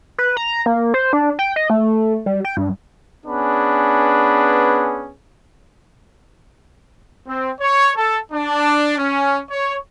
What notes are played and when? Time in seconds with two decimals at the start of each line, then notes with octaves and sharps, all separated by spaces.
0.18 B4
0.37 A#5
0.66 A#3
0.94 C5
1.13 D4
1.39 G5
1.56 D#5
1.70 A3
2.26 G3
2.45 G5
2.57 G2
3.26 B3 C#4 D4 G#4 B4
7.26 C4
7.60 C#5
7.96 A4
8.32 D4
8.97 C#4
9.51 C#5